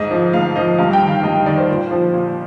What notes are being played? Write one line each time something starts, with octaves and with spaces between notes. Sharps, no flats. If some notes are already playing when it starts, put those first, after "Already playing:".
Already playing: G#2 D#5
F3
G#2 F5
F3 D#5
G2 F5
G5
D#3
F5
G2 D#5
D#3 D5
C5
A#2
F3
A#2